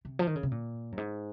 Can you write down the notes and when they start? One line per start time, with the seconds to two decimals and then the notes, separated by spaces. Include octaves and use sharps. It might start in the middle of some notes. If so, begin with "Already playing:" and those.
0.05 C3
0.19 F3
0.27 D#3
0.36 C#3
0.43 C3
0.52 A#2
0.92 F#2
0.98 G#2